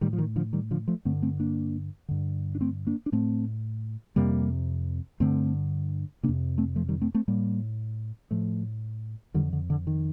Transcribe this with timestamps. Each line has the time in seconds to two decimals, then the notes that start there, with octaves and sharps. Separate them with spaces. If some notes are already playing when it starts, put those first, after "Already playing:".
0.01 A2 D#3 G3
0.13 F3
0.18 D#3
0.36 D3 F3
0.53 D#3 G3
0.71 D3 F3
0.88 F3 A3
1.05 G2 D3 A3 C4
1.22 A3 C4
1.40 A#3 D4
2.08 G2 D3
2.55 D4
2.61 A3 C4
2.87 A#3 D4
3.06 D4
3.12 A2 A3 C4
4.16 F2 C3 G3 A#3
5.20 G2 D3 A3 C4
6.23 C3 A#3 D4
6.28 F2
6.58 A3 C4
6.76 F3 A3
6.89 D#3 G3
7.01 A3 C4
7.14 A3 C4
7.28 A2 G3 A#3
8.31 A2 F3 A3
9.34 F2 D3 D#3 G3
9.53 D3
9.70 D3
9.87 D#3